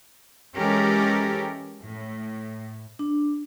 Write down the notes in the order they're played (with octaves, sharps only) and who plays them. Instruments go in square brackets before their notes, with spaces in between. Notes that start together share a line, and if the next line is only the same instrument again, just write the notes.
[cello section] E3 G#3 C#4 G4 A4 A#4
A2
[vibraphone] D4